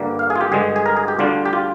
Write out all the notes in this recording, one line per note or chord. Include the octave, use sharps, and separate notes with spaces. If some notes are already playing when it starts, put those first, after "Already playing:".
Already playing: G2 D3 G3 A#3
F5
G#4
F4
G4
G2 D3 G#3 G#4
G#4
A#4
G#4
G4
D2 D3 G3 D4 F4
G4
F4